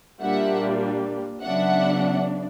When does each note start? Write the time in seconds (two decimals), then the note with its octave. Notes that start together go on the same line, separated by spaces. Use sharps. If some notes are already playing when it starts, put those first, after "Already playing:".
0.21 A#2 G3 A#3 D4 F4 E5 F#5
1.42 C#3 F#3 B3 D4 E5 F#5